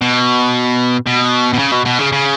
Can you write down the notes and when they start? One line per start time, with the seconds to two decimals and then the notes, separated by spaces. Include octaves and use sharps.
0.01 B2
1.06 B2
1.54 B2
1.59 C#3
1.72 B2
1.85 B2
1.98 C#3
2.12 C#3